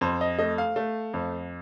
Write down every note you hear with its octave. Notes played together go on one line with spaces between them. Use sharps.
F2 C5
D#5
A3 D#5
F5
A3
F2